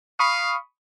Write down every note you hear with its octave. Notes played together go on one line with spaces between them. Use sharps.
F5 B5 C#6 D#6